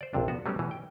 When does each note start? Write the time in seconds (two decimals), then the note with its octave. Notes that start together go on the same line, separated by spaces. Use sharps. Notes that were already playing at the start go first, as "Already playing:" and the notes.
0.01 C5 D5
0.13 A#1 F2 C3 D4
0.28 B3 F#4
0.46 F#3 G3 A3 B3 C#4
0.59 B2 E3
0.71 G5